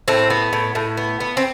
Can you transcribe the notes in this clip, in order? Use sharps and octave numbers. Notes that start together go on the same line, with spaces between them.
A2 C4
B3
A2
A2
B3
B3
C4